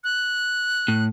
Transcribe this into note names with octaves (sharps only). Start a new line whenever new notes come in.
F#6
A2